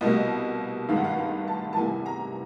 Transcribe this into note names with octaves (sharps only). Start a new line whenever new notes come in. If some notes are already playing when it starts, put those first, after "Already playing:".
C2 B2 G3 A#3 D#5
G#1 G2 D#3 G#3 F5
F#5
F5
F5
A5
A5
E2 C3 E3 G3 A#3 G#5
A#5